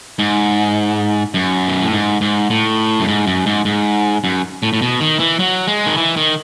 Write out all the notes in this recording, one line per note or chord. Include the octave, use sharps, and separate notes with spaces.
G#2
F#2
B2
A2
G#2
G#2
A2
F#2
G#2
F#2
G#2
G#2
F#2
A2
A2
B2
D#3
E3
F#3
G#3
D#3
E3
D#3